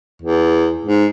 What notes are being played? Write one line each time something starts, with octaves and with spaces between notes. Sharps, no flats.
E2
G#2